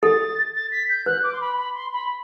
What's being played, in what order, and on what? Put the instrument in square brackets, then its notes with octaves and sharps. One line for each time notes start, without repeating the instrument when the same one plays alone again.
[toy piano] A4 [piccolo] A6
[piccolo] A6
B6
G6
[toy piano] B4 [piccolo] F#6
[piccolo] D6
C6
B5
B5
C6
B5